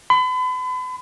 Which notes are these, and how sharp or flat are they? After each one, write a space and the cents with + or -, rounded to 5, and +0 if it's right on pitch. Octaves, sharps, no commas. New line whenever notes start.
B5 +40